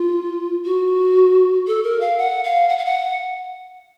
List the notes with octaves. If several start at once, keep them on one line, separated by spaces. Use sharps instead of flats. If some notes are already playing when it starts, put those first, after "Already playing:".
Already playing: F4
F#4
A4
A#4
F5
F#5
F5
F#5
F5
F#5